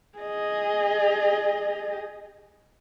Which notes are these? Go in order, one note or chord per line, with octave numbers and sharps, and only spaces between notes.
G#4 D#5